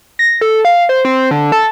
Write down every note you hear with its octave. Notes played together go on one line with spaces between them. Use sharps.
A#6
A4
F5
C5
C4
D3
A4